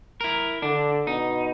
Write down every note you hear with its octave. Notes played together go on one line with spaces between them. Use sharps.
E4 A#4
D3 D4
B2 D#4